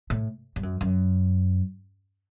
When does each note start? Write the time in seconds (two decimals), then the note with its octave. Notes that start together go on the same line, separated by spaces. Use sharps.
0.10 A2
0.56 G2
0.63 F#2
0.81 F#2